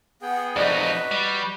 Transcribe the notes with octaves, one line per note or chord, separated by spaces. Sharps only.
B3 G#4 F#5 G5
F2 D#4 F#4 B4 D5 D#5
G3